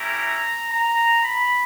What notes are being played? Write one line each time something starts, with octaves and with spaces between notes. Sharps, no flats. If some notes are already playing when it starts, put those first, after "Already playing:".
Already playing: A3 C#4 E4 G4 A#5
A#5
B5